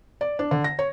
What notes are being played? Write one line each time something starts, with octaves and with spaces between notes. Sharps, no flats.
D5
D4
D3
A#6
C#5